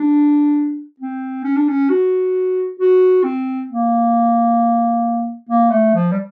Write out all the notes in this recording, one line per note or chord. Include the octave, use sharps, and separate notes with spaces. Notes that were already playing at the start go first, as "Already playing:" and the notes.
Already playing: D4
C4
C#4
D4
C#4
F#4
F#4
C4
A#3
A#3
A3
F3
G3